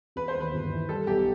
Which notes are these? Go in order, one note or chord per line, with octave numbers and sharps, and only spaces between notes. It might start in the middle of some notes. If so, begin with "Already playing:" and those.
E1 B4
C5
D#2
B4
G1
E3
G3 A4
B1 G4